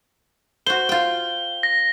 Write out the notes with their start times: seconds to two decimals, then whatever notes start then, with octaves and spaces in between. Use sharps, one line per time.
0.66 F#4 C5 G7
0.89 F4 G5
1.63 A#6